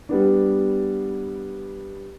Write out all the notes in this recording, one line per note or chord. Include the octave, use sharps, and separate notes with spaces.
G3 B3 D4